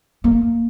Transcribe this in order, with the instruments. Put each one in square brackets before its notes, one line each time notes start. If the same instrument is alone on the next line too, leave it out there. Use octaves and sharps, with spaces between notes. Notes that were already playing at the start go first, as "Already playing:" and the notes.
[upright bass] A#3